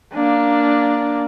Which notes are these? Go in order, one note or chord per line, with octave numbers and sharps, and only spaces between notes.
A#3 D4